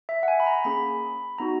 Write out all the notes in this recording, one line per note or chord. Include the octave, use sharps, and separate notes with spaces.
E5
F#5
G#5
B5
A#5
A#3 C#4 G#4 B5
B3 D#4 F#4 A#5